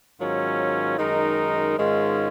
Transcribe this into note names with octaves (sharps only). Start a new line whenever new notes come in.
G#2 D#3 F#3 C#4 F4
F#2 D#3 G#3 D#4 A#4
G#2 D#3 G#3 C#4 F4